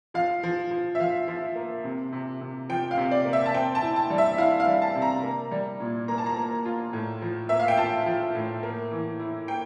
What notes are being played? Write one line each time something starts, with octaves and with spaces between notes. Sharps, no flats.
F3 F5
F3
F3
E5
F3 F5
F3
A#3
C3
C3
C3
F3 G5
F5
C3
D5
A#3
E5
A5
C4 G5
A5
E4
A5
G3
E5
E4 F5
F5
G3
A5
C3
A#5
A#3
G3
A#2
A#3 A#5
A5
A#5
A#3
F4
A2
F3
A#3 E5
F5
G5
F4 A5
F3
A2
A#3
E3
E4
A#3 G5